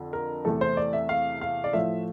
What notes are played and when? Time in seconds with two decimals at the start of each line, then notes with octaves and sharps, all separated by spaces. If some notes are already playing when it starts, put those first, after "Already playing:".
Already playing: F2 D3
0.13 A#4
0.45 E2 C3 E3 A3 A4
0.61 C5
0.77 D5
0.93 E5
1.09 F5
1.41 F5
1.64 D5
1.73 A2 F3 A3 E5